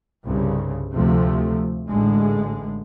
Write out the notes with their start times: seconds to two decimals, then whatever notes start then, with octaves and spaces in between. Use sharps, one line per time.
0.24 C2 G2 C#3
0.93 D2 C3 F3 A3
1.89 A1 A2 D3 G#3